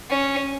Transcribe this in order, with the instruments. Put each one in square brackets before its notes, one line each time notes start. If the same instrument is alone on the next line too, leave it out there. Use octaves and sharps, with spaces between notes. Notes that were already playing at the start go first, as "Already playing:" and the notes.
[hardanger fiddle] C#4